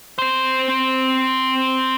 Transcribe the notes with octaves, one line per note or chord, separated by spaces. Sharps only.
C4 C5